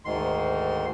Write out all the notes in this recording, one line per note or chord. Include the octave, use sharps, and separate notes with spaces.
D2 G#2 D#3 C6